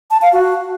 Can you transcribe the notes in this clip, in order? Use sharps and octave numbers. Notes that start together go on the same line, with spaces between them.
A5
F5
F#4